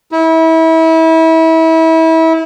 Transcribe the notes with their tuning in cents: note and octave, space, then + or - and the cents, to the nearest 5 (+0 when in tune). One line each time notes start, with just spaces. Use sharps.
E4 -30